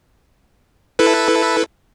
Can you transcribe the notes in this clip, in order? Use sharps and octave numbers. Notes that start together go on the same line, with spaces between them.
E4 A4 B4